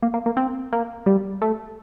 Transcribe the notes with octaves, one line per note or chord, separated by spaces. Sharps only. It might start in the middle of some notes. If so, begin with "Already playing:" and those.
A#3
A#3
A#3
C4
A#3
G3
A3